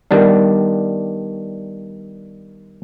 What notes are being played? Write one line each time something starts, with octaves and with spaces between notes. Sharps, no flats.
D#3 G3 B3 D4